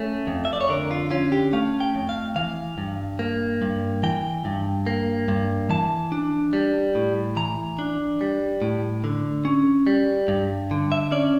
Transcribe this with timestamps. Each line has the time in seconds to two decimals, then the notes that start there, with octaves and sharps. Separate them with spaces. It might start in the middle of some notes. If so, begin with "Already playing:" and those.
Already playing: A3 C#4
0.27 F2
0.45 E5
0.53 D5
0.61 C#5
0.69 D3 A#4
0.91 F4
1.11 C#4 F4
1.32 G4
1.53 A3 F5
1.80 G5
1.95 F2
2.09 F5
2.36 E3 F5
2.78 G2
3.19 A#3
3.62 G2
4.03 E3 G5
4.45 G2
4.87 A#3
5.28 G2
5.70 E3 A5
6.12 D4
6.53 G3
6.95 A2
7.36 E3 A#5
7.79 D4
8.21 G3
8.62 A2
9.04 D3
9.45 C#4
9.87 G3
10.28 G2
10.71 D3
10.92 E5
11.11 C#4 D5